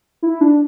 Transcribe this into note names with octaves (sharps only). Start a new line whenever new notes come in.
E4
D4